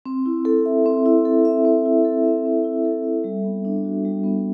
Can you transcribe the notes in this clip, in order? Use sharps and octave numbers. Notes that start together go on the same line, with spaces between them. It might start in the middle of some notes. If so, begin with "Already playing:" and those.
C4
E4
A4
E5
C4
E4
A4
E5
C4
E4
A4
E5
C4
E4
A4
E5
G3
B3
D4
F#4
G3
B3